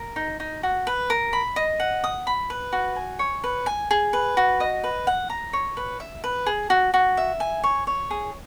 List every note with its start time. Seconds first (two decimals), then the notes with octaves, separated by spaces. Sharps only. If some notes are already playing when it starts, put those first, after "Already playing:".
Already playing: A#4
0.16 D#4
0.40 D#4
0.63 F#4
0.87 B4
1.10 A#4
1.33 B5
1.56 D#5
1.80 F#5
2.04 D#6
2.27 B5
2.50 B4
2.73 F#4
2.96 G#5
3.19 C#5
3.44 B4
3.66 G#5
3.91 G#4
4.13 B4
4.37 F#4
4.60 D#5
4.84 B4
5.07 F#5
5.30 A#5
5.53 C#5
5.77 B4
6.00 E5
6.24 B4
6.46 G#4
6.70 F#4
6.94 F#4
7.17 E5
7.40 G#5
7.64 C#5
7.87 C#5
8.11 G#4